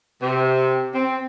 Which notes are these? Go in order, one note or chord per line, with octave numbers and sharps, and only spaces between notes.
C3
C4